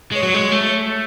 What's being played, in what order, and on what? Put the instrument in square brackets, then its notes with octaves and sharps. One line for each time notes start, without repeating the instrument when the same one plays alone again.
[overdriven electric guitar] G#3 [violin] C#5
[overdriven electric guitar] F#3
G#3
A3